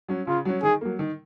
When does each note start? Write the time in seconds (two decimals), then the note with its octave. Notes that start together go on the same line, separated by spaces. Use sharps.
0.08 F#3 C#4
0.27 C#3 F4
0.45 F#3 C#4
0.63 D#3 G#4
0.81 F#3 A#3
0.99 D#3